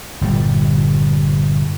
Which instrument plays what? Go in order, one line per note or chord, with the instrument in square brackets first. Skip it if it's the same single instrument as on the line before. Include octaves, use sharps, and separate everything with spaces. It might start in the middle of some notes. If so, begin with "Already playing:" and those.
[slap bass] G1 A#2 G3